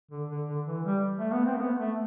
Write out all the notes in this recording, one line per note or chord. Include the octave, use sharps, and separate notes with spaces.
D3
D3
D3
E3
G3
A3
B3
C4
A3
B3
A3